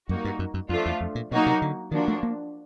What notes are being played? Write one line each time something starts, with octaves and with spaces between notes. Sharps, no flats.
F#2 G3 A#3 D#4 F#4
G2
F#2
F#2
F2 F3 A3 D4 F4
E2
F2
A#2
B2 F#3 A#3 D#4 F#4
C3
D3
D#3 F3 A#3 D4 F#4
A3
A#3